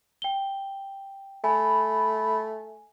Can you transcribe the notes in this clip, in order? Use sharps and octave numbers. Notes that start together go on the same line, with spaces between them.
G5 G7
A3 G#5 B5